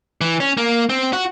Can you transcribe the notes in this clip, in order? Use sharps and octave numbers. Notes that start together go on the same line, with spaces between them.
E3
C#4
A#3
C4
F#4